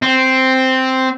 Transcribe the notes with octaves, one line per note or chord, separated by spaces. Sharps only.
C4